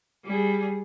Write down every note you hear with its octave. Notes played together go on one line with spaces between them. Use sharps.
G3 G#4